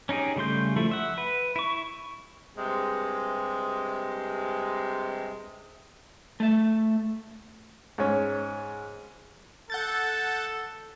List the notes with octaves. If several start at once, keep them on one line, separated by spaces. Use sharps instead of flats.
C#4 D#4 G4 G#4
C#3 G3 A3 C6 G6
F3 A3 E4
E5 F#5
B4
E4 C#6
G2 C3 G#3
A3 E5
G#2 C#4
A4 F#5 G6 A6